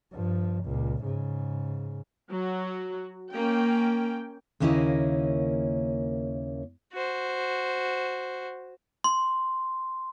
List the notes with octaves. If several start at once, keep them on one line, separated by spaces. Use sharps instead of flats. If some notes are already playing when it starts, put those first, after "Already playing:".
G2 F3
C#2 A#2
G#2 C#3
F#3 F#4
A#3 C#4 G5
D#2 C#3 A#3 C#4 E4 D#5
F#4 C5
C6